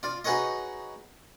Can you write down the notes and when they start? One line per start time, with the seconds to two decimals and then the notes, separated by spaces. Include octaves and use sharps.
0.03 F4 D5
0.24 D#4 F#4 G#4 B4 C#5 D#5